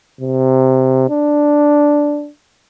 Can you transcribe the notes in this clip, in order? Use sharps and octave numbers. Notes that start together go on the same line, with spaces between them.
C3
D4